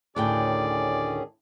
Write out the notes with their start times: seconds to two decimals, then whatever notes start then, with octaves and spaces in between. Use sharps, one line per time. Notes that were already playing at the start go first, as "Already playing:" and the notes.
0.16 D2 A2 D#3 C#4 G#4 D5 G5